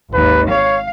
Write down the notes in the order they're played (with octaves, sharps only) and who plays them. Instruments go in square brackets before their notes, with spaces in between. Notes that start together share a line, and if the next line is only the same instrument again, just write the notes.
[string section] G#1 D#2 [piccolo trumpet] B4
[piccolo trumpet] C#5 [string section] F5